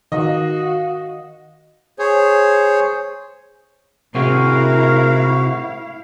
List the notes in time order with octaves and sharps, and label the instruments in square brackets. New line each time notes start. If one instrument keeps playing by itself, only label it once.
[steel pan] D#3 [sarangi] F#4 [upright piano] D#5 [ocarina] F5
[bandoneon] G#4 C5 C#5
[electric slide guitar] C3 C4 G#4 [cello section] A3 E4 F5 [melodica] F#4 [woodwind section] A#4